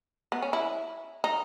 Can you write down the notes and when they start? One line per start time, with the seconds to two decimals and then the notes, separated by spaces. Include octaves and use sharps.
0.32 B3
0.42 C#4
0.53 E4
1.24 D#4